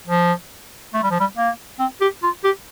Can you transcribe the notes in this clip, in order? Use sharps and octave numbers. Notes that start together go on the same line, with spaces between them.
F3
A3
G3
F3
G3
A#3
C4
G4
F4
G4